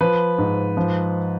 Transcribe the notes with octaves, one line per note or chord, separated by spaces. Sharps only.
F3 B4
G#2
F3